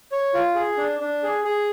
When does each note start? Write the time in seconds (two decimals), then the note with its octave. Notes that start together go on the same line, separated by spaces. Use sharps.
0.12 C#5
0.34 F4
0.55 G#4
0.78 D4
1.00 D4
1.23 G#4
1.44 G#4